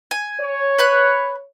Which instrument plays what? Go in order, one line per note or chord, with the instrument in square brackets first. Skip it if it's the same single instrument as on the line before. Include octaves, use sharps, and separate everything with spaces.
[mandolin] G#5
[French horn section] C#5
[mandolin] B4 B5 F#6